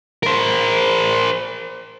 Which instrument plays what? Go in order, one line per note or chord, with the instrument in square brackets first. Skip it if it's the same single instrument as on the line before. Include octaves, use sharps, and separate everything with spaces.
[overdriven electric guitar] A#4 C5